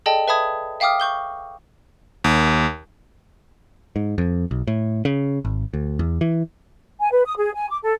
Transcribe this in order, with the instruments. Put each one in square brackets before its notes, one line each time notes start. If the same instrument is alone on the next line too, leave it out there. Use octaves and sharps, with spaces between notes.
[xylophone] G#4 A4 D5 D#5 G5 A5
B4 E5 A5 B5 D#6 G#6
E5 F5 G5 D6 D#6 F6
C#6 G6 G7
[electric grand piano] D#2
[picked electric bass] G#2
F2
B1
A2
C#3
G#1
D2
E2
E3
[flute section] G#5
B4
D#6
G#4
G#5
D6
A4